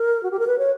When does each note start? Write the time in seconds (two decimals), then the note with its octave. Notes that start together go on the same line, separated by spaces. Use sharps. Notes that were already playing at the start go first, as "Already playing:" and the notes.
Already playing: A#4
0.23 F#4
0.31 G4
0.39 A#4
0.47 B4
0.59 C#5